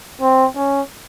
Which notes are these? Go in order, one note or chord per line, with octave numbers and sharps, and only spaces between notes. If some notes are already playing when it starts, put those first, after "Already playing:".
C4
C#4